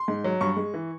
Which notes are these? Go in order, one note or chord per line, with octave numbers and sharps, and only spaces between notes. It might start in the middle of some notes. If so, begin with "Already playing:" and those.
Already playing: C6
G#2
F#3
G2 C#6
G#3
E3